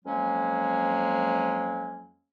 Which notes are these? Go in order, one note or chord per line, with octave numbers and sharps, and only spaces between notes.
F2 F#3 G#3 A#3 C#4